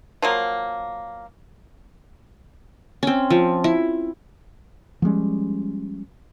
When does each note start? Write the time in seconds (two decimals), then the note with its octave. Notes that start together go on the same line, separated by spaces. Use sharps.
0.22 F3 F#3 A#3
3.03 C4 C#4
3.30 F3
3.64 E4
5.02 F3 G3 G#3 C#4